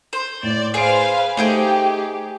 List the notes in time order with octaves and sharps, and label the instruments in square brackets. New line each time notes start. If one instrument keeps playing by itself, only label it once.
[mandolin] C5
[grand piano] A2 [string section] D5
[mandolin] G#4 [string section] B4 C5 F5 [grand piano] C7 D7
[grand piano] A3 C5 [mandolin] D#4 G#4 G5 [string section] G4